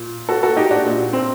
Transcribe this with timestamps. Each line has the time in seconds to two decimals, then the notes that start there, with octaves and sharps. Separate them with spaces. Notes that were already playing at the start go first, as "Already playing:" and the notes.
Already playing: A#2
0.29 F#4 A4
0.43 F#4 A4
0.57 D#4 G4
0.71 D4 F#4
0.85 A#2
1.13 C4